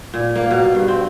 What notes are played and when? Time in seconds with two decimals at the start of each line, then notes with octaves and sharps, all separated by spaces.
0.14 A#2
0.36 A#3
0.51 B2
0.75 G2
0.88 C4